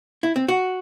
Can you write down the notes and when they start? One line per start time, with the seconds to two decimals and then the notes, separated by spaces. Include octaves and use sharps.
0.23 E4
0.36 C4
0.48 F#4